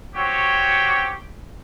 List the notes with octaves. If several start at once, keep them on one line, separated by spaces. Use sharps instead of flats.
C4 F#4 G4 C#5